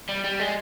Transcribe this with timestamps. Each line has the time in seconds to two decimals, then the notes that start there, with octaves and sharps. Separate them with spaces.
0.09 G3
0.24 G3
0.39 G#3